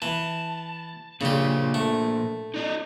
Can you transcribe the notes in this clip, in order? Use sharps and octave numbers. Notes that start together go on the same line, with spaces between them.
E3 A5
A#2 C#3 D4 G4
A3
D#4 D5 D#5